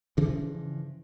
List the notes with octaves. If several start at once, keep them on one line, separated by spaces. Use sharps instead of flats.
G2 C#3 E3 F3